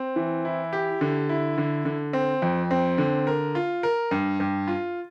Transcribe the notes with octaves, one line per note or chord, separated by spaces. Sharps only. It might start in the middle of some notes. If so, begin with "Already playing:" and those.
Already playing: C4
E3
E4
G4
D3
E4
D3
D3
C4
F2
C4
D3
A#4
F4
A#4
G2
G2
F4